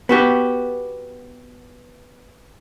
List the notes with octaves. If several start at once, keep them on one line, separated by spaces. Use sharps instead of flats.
B3 F#4 G4